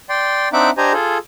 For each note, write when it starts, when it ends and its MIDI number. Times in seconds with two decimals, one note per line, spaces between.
0.09 0.49 74
0.09 0.49 79
0.09 0.49 84
0.53 0.70 60
0.53 0.70 62
0.53 0.70 63
0.53 0.70 76
0.53 0.70 78
0.53 0.70 86
0.78 0.93 62
0.78 0.93 67
0.78 0.93 72
0.78 0.93 75
0.78 0.93 80
0.78 0.93 82
0.93 1.18 65
0.93 1.18 68
0.93 1.18 69